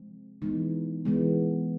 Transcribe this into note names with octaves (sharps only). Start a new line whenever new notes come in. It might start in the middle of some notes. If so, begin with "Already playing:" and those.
Already playing: F3 G#3 C4
E3 G#3 B3 D#4
E3 G#3 B3